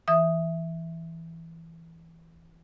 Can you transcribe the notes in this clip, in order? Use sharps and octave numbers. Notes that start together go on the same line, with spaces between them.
E3 E5 D#6